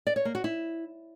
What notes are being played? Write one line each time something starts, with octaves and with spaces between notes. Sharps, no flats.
D5
C#5
A#3
F#4
E4